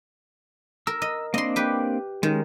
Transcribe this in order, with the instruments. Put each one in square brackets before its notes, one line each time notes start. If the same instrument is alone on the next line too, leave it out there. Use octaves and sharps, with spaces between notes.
[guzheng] A#4 [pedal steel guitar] E6
[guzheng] D#5
[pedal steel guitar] A#3 C4 D4 [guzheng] D#5 C6
[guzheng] G4 B4
[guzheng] D#3 [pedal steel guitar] G#3 C#4